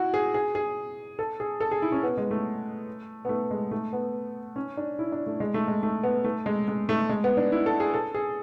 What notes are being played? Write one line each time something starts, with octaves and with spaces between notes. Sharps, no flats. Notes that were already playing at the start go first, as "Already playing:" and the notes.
Already playing: E4 F#4
G#4
G#4
G#4
A4
G#4
A4
G#4
E4
C#4
B3
G#3
A3
B3
A3
G#3
A3
B3
C#4
D4
E4
D4
A3
G#3
A3
G#3
A3
B3
A3
G#3
G#3
A3
G#3
B3
D4
E4
A4
G#4
A4
G#4